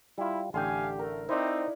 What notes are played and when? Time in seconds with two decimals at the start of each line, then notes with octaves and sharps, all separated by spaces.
0.18 G3 E4 F4
0.54 A1 D3 G4 F5 G5 G#5 C6
0.99 A3 A#4
1.29 C4 D#4 E4 C5 D5 F#5